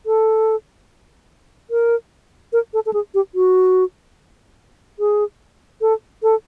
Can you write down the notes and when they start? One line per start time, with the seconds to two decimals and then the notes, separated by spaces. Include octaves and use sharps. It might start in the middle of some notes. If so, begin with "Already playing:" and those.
0.06 A4
1.71 A#4
2.53 A#4
2.74 A4
2.86 A4
2.93 G#4
3.14 G4
3.35 F#4
4.99 G#4
5.81 A4
6.23 A4